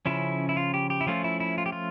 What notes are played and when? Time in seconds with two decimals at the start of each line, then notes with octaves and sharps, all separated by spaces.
0.06 C#3 F3 C#4 E4
0.49 E4
0.57 F4
0.74 G4
0.90 G4
1.01 E4
1.07 F3 A3 C#4 F4
1.24 E4
1.40 E4
1.58 F4
1.66 G4
1.72 F4